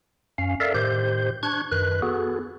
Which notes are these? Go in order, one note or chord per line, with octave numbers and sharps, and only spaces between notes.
F#2 C#4 F5
A4 A#4 D5 E5 F5
A2 D#3 G4 C5 G6
D4 C#6 F#6 G#6
F#2 D#3 B4 F#6
B3 F#4 G#4 A4